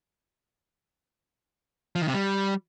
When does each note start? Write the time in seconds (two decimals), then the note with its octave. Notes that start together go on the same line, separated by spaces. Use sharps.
1.95 F3
2.02 D#3
2.08 C3
2.14 G3